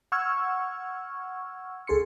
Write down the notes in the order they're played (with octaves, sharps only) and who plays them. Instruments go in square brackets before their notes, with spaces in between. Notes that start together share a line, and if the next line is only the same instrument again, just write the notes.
[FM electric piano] F#5 C#6 E6 F6 G#6
C#2 G#4 A4 C6 C#7